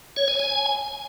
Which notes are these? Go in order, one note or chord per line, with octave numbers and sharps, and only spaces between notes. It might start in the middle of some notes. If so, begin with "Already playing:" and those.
C#5
G#5
G#5